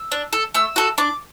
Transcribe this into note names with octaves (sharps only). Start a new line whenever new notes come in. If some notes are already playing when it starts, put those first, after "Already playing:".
Already playing: E6
D4
A4
A3 E6
F#4 A4
D4 D6